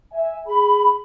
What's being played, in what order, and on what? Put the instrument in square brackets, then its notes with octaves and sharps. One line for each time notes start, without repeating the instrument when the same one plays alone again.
[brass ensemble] E5 G#5
[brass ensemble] G#4 [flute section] B5